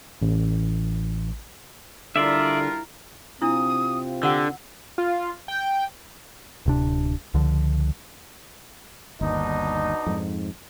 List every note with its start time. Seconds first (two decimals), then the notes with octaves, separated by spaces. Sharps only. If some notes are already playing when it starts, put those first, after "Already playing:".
0.22 A1
2.16 D3 G3 D4 E4 F4 A#4 D5 E5
3.42 C3 C4 D4 E4 F4 D#6
4.23 D3 G4 F#5 E6
4.98 F4
5.48 G5
6.66 D1 C3 D4
7.34 C#2 D3 F3
9.21 G1 D#2 B2 D4 D#4
10.06 F2 G#2